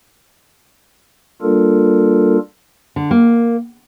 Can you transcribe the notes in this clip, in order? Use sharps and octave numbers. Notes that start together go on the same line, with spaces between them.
G3 A#3 D4 F4 A4 A#4
D3
A#3